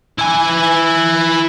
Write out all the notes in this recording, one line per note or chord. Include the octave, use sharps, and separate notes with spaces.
E4 G#5